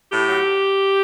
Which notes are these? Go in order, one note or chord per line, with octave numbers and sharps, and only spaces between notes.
A2 G4
F#3